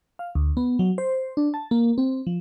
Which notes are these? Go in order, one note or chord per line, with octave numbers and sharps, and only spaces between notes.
F5
D2
B3
F#3
C5
D4
A5
A#3
C4
F3